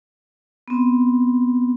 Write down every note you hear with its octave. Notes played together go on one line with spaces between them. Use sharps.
B3 C4